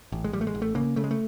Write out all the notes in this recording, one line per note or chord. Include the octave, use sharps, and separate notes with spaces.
A1
G#3
A1 G3
A3
G#3
A1
A3
C#3 A#3
C#3 A3
G#3
A3